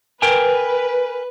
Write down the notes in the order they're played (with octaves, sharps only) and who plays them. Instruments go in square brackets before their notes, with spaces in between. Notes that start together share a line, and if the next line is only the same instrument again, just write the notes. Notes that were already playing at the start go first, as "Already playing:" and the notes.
[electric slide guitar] A#4 G5 G#5 [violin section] B4